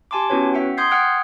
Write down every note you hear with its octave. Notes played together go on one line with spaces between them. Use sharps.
G4 G#5 A5 C6 D6
B3 C#4 E4 F#4 B4 C#5
E5 F#5 G5
C6 D#6 G6 G#6 C7
F#5 G5 D#6 F6 F#6 G#6